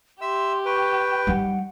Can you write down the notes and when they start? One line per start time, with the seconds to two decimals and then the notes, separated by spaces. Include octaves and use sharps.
0.21 G4 E5 C6 E6
0.66 B4 G5 C#6
1.27 G3 D#4 F#5